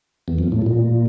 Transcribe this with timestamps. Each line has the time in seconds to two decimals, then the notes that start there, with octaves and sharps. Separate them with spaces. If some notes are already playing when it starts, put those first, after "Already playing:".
0.28 E2
0.38 F2
0.52 A2
0.66 A#2